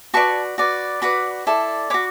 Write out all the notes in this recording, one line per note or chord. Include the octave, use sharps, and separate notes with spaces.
F#4 B4 D5 A5 C#6
F#4 B4 D5
F#4 B4 D5 B5 D6
E4 A4 D5
F#4 C#5 B5 D6